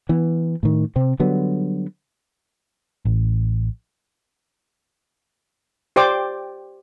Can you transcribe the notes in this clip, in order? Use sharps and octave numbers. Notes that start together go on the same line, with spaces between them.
E3 B3
A2 D#3
C3 C4
D3 F#3 G3 B3
A1
G4 C5 D5 G5 D6